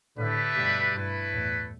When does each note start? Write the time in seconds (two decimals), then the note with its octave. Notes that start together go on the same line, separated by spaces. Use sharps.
0.17 A2 D3 A3 D4 G4 B4 E5
0.55 G2 B2
0.93 G2 A3 E4 B4
1.32 E2 A2